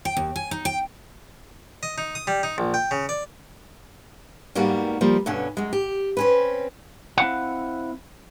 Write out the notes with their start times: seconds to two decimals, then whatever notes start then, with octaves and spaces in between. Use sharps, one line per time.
0.05 G5
0.17 D#2
0.36 G#5
0.51 D#4
0.65 G5
1.83 D#5
1.98 D#4
2.15 D#6
2.27 G3
2.43 D#4
2.58 A#1
2.74 G5
2.91 C#3
3.09 D5
4.55 G#2 G3 A#3 B3 F#4 A#4
5.01 F3 G3 A#3
5.26 G2 B2 D3 C#4
5.57 F#2 G#3
5.73 G4
6.17 C4 C#4 B4
7.18 C4 E4 F5 F#5